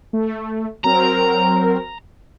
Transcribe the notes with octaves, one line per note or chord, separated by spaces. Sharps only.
A3
F#3 C4 A#4 A#5